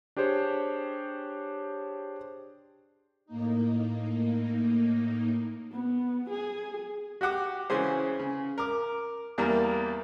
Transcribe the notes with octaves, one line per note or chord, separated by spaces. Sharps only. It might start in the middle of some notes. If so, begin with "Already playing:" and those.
D4 G4 G#4 C5 C#5
A2 A#3 D#4
B3
G#4
F#4 G4 F#5 D6
C#3 E3 C#4 G#4 C5
C#3
A#4 D6
E2 G3 A#3 A#4